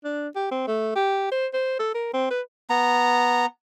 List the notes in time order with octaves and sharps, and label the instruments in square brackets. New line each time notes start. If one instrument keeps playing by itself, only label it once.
[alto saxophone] D4
G4
C4
A3
G4
C5
C5
A4
A#4
C4
B4
[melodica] B3 A#5